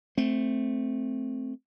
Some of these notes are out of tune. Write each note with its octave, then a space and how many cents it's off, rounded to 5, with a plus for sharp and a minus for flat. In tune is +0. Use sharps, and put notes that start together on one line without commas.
A3 +0 C4 +0